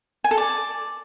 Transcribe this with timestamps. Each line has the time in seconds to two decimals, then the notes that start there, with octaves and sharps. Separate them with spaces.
0.24 G#5
0.31 A4
0.38 D5